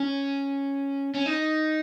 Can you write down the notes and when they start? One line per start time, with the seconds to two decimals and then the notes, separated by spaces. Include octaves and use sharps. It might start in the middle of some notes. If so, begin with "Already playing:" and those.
Already playing: C#4
1.14 C#4
1.26 D#4